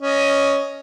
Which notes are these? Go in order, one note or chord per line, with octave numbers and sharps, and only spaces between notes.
C#4 D#5